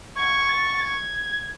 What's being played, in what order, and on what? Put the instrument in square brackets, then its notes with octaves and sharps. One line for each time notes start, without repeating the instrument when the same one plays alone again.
[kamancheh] C#6 [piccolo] G#6
[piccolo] A6
A6
G#6